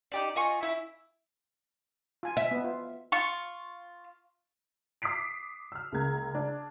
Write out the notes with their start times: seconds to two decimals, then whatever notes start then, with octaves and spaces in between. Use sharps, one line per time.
0.12 D#4 G4 D5
0.35 F4 D#5 G#5 C#6
0.60 E4 E5
2.23 F4 G#5
2.37 E5
2.51 B3
2.64 F4
3.12 F4 C#6
5.02 D6 D#6 B6 C7 D7
5.72 E6 F6
5.92 C#2 C#3 A#3 A#5 G#6
6.35 D4